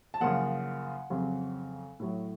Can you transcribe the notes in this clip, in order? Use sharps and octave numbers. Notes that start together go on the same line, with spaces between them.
A5
F#2 C#3 F3 A#3 F#5
F2 C#3 F#3 C4
A2 F#3 A3